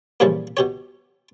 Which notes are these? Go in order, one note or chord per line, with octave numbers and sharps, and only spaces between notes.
G2 A#2 C#3 E3 F3 G3
B2 G4 C#5